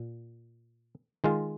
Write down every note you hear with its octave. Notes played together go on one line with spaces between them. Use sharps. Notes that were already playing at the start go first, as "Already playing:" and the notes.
Already playing: A#2
D#3 G#3 F4